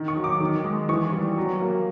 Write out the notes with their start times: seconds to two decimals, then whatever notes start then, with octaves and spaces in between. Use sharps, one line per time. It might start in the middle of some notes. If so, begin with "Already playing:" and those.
Already playing: D#3
0.08 C#6
0.16 F#3
0.24 D6
0.40 D#3
0.64 G#3
0.89 E3 C#6
1.12 G3
1.38 F#3
1.61 A#3